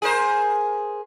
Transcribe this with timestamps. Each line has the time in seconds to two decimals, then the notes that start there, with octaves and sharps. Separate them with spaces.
0.02 G#4 A#4 C5